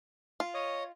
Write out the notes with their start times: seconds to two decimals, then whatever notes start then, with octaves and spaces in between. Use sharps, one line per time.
0.40 F4
0.54 C#5 D#5 D#6